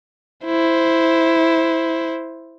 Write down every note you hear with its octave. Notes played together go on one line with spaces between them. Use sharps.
E4 C5